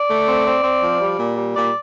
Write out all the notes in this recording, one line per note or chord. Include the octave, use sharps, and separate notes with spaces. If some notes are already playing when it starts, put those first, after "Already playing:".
Already playing: D5
A3
C4
C4
C4
F3
G3
A#2
G3
A#2 D5